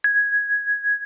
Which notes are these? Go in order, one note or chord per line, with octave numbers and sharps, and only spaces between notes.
G#6